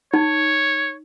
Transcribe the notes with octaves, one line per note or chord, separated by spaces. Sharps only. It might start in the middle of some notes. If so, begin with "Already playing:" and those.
D#4 C#5